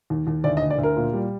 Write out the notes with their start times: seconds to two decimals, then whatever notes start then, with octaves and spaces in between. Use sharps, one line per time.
0.10 D#2
0.27 D#2
0.44 D2 D5
0.57 D#5
0.62 D2
0.70 D5
0.78 D2
0.83 A#4
0.97 A#2
1.13 G3